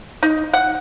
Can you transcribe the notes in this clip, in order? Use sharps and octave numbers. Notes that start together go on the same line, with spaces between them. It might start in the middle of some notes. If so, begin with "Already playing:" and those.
D#4
F#5